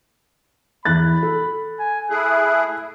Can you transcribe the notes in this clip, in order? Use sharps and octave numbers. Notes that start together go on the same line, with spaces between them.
E2 B5 F#6 A6
A4
G#5
A3 E4 G#4 F#6